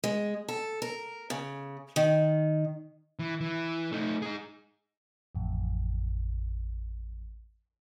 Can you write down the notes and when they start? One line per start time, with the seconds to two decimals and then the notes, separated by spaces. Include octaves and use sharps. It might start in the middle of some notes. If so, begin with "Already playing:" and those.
0.04 G#3
0.48 A4
0.82 A#4
1.30 C#3
1.96 D#3
3.19 E3
3.41 E3
3.92 A3 D#4
4.22 D#4 G#4
5.35 A1 F2